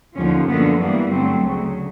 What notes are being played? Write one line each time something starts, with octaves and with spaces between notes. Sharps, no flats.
D#2 D3 F3 C#4
F#2 D3 F3 A#3 B3
G2 E3 G3 A#3 B3
G2 D3 F#3 A3 C4
D2 C#3 F#3